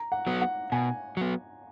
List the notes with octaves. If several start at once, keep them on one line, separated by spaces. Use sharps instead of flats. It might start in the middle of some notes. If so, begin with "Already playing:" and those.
Already playing: A#5
F#5
F#3 B3
F#5
B2 G#5
F#3 B3